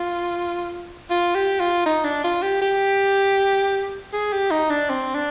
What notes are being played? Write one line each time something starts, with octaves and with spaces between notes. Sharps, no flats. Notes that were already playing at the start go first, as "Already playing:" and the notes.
Already playing: F4
F4
G4
F4
D#4
D4
F4
G4
G4
G#4
G4
D#4
D4
C4
D4